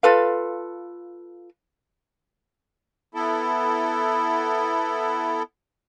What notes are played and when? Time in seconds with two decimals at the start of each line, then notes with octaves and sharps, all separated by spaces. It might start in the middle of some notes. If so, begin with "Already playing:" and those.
0.03 F4 A4 B4 F5
3.15 B3 E4 A4